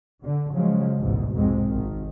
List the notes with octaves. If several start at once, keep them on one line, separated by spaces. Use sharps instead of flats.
D3
C#3 F3 F#3 G#3
A1 D2 G#2 B2
B1 F2 G#2 C3 G#3 C4
G#1 G#2 D#3